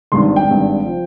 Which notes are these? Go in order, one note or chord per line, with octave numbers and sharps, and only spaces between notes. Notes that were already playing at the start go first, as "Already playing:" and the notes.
G#1 G2 D#3 C6
G5
G#1 G2 D#3
F3